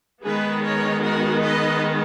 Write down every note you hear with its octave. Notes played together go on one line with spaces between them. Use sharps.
D#3 G#3 B3 G#4 B4
A#4 C#5
F#4 A#4
B4 D#5